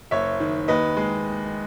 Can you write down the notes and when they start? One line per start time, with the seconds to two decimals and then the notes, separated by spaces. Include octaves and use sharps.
0.11 F#1 C#5 E5
0.40 D#3
0.68 D#2 B4 D#5
0.97 G#3